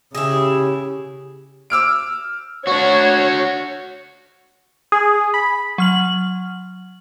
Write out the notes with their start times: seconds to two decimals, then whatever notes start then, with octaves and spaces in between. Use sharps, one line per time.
0.15 C#3 E4 G4 G#4
1.70 D6 E6 F6 D7
2.67 D4 F#4 C#5
4.92 G#4
5.34 B5
5.78 F#3 F6 F#7